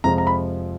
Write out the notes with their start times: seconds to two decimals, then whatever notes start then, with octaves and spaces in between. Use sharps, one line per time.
0.04 F2 C3 F3 G#3 A#5
0.18 A#5
0.27 B5